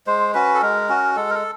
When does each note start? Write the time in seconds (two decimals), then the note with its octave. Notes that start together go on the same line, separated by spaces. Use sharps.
0.07 G#3 C5
0.34 C#4 F#4 B4
0.55 A4
0.62 G#3 A#4
0.89 C#4 F#4
1.16 G#3 A4
1.30 A#4
1.35 A4